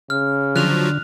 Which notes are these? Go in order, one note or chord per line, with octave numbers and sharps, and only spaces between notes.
C#3 F6
D3 F3 F#3 F#6 F7